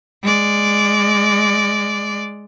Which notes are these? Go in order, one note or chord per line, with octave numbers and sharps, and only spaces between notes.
G#3 D5